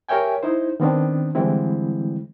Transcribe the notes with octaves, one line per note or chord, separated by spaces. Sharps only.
G4 A#4 C#5 E5 G5 G#5
D#4 E4 C5
D#3 B3 C4 D4
D3 E3 G3 G#3 C4 E4